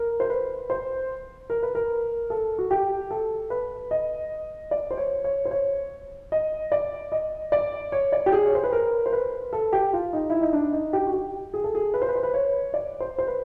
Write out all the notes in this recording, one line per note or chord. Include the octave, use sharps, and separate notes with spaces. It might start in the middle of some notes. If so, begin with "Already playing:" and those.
Already playing: A#4
C5
B4
C5
A#4
B4
A#4
A4
F#4
G4
A4
B4
D#5
D5
C5
C#5
C#5
C5
C#5
D#5
D5
D#5
D5
C#5
D5
G4
G#4
C#5
C5
B4
A#4
C5
B4
A4
G4
F4
D#4
E4
D#4
D4
D#4
G4
F#4
G4
G#4
A4
G#4
B4
C5
B4
C5
B4
C#5
D5
C5
C5
B4